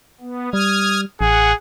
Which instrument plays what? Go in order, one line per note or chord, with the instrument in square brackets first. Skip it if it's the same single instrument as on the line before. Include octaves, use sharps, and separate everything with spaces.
[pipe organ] B3
[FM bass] G3 [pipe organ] D#6 F6 G#6
[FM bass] A1 [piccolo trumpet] G#4 [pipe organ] F#5